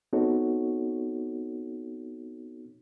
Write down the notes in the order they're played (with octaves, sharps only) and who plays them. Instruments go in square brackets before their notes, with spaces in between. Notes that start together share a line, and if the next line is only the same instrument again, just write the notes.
[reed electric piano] B3 C4 D#4 F#4 A4 C#5